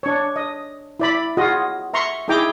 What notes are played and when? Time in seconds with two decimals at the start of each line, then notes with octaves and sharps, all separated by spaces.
0.03 D4 C#5
0.36 D#5
1.00 E4 D5 B5
1.37 F4 F#4 G#4 D#5
1.93 E5 A#5 C6 C#6
2.28 D#4 E4 G#4 G5 A#5 D6